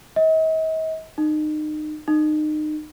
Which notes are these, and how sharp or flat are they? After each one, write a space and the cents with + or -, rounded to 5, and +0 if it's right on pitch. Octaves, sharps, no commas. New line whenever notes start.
D#5 +45
D#4 -30
D#4 -30